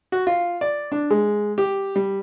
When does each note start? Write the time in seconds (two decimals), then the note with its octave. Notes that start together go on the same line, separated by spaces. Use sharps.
0.12 F#4
0.27 F4
0.61 D5
0.92 D4
1.11 G#3
1.58 G4
1.96 G3